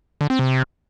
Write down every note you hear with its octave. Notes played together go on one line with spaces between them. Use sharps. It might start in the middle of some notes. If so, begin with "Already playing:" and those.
D3
C4
C3